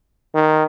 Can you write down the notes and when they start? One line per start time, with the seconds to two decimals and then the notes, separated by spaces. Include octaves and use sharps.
0.35 D#3